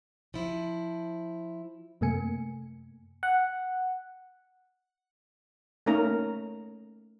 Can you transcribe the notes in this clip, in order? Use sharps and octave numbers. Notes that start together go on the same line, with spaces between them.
F3 E4
F#2 C3 A3 A#3 G#5 C#7
F#5
A3 A#3 C#4 D#4 A#4 A#5